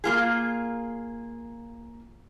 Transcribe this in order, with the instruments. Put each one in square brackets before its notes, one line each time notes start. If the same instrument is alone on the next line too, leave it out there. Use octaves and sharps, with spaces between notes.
[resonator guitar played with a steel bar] A#3 F4 G#4